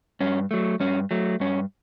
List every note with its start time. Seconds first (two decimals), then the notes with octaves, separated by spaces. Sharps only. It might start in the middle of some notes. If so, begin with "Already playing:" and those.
0.20 G2 C#4
0.51 F#3 A3
0.80 G2 C#4
1.11 F#3 A3
1.40 G2 C#4